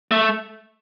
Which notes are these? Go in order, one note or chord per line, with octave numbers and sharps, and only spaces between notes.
A3